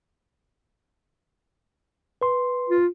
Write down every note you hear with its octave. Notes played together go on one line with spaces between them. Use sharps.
B4 C6
F4